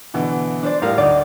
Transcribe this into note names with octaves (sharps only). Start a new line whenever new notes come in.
B2 D3 E3
D4 C5 D5
A2 G4 A#4 F5
D2 D#4 D5